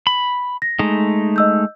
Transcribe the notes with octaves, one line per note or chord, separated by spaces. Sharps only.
B5
A#6
G#3 A3 D#4
D#5 E6 G6